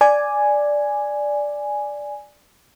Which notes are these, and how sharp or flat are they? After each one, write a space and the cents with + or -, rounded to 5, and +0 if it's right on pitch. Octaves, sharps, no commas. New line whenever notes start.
D5 +0 G#5 +0